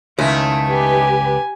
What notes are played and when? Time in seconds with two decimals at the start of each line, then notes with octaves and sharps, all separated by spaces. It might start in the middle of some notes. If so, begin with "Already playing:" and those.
0.19 C#2 D#3 A3 C#4 E4
0.68 G4 B4 G#5